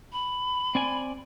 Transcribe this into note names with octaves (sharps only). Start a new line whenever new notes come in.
B5
C4 D5 G#5